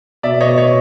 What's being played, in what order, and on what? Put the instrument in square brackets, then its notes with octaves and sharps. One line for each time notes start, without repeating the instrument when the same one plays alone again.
[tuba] B2 [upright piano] D5 E5
[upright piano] C#5 D#5
C#5